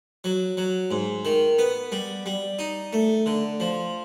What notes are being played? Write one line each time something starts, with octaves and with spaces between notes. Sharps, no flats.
F#3
F#3
G#2
D#3
B3
G3
G3
D#4
A3
D3
F3